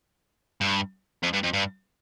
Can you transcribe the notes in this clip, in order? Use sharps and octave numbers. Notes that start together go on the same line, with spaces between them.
G2
F2
G2
F2
G2